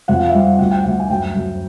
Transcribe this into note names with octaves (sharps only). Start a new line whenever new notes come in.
F2 F#5
F5
G3 E5
F5
D2 F#5
G5
D2 F#5
G#5
F#2 G5
F#2